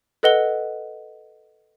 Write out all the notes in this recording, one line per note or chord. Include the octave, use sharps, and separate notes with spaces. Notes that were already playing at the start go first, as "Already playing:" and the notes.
A4 B4 D#5 F#5 G7